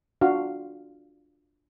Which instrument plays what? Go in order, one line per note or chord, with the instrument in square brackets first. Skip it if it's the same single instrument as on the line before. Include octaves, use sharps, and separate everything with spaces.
[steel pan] D4 F4 F#4 F5